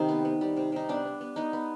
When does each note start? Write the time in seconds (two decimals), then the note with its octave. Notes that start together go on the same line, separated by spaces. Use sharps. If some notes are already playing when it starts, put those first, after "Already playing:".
Already playing: C3 D#3 C4 D#4
0.09 B3
0.25 B3
0.41 G3
0.57 C3
0.72 C3 D#4
0.89 B3 D4
1.05 B3
1.21 B3
1.36 B3 D#4
1.53 B3